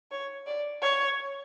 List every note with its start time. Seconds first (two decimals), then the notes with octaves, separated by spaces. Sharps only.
0.12 C#5
0.47 D5
0.82 C#5